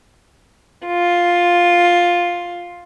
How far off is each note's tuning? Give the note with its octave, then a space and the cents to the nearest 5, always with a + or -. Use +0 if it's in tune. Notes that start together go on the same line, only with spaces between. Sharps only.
F4 +5